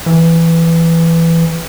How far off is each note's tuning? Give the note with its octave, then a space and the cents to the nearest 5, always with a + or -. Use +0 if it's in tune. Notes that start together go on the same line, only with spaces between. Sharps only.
E3 +10